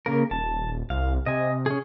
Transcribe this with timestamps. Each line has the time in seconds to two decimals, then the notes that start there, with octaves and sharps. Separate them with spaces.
0.06 C#3 A#3 A#4
0.31 D#1 A5
0.90 C2 F5
1.26 C3 D#5 G#5
1.66 C#4 G#4